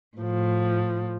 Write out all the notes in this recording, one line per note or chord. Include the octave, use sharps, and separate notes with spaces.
A2 F3